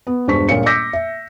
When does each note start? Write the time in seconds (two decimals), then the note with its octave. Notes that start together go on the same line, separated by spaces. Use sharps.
0.07 B3
0.28 E1 G2 C5 C#6 B6
0.49 D#1 A#1 A#2 C#5 F5 C#7
0.66 D6 E6 G6 A#6 B6
0.93 E5